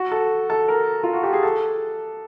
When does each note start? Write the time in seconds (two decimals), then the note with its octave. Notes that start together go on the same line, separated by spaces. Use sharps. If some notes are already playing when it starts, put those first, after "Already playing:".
Already playing: F#4
0.11 A4
0.50 A4
0.68 A#4
1.03 F4
1.13 F#4
1.23 G4
1.33 G#4
1.43 A4